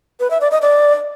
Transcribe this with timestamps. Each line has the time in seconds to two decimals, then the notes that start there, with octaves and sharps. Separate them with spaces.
0.20 B4
0.30 E5
0.41 D5
0.51 D#5
0.62 D5